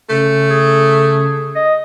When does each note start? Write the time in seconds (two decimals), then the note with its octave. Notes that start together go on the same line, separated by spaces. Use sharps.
0.09 C#3 A3
0.50 G#4
1.55 D#5